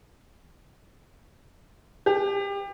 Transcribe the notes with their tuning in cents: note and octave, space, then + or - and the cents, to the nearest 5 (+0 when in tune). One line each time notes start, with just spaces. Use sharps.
G4 +30